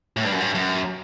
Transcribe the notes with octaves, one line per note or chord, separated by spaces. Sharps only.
A2
G2
F#2
G2
F#2